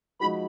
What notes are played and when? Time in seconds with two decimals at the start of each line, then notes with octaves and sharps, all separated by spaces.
0.21 F3 G#3 D#4 F#4 B5